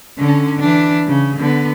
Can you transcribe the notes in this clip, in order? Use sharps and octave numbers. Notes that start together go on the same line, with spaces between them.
D3 C#4
E3 D4
C#3
D3 B3